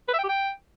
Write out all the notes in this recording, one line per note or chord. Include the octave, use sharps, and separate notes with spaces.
B4
E5
G5
G4
G5